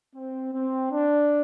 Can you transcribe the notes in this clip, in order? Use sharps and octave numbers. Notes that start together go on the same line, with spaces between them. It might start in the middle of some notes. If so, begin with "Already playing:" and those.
C4
C4
D4